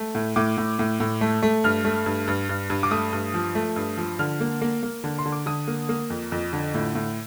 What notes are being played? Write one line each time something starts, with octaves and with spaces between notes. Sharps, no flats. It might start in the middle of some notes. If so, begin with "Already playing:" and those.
Already playing: A3
A2
A2 D6
A2
A2
A2
A3
A3
G2 F6
A3
G2
G2
G2
G2
D6
A3 D#6
G2
F3
A3
G2
F3
D3 F6
A#3
A#3
A#3
D3
C6
D3
D6
D3 D#6
A#3
A#3
F2
F2
D3
A2
A2